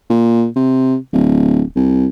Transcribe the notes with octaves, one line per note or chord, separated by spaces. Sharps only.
A#2
C3
D1
C2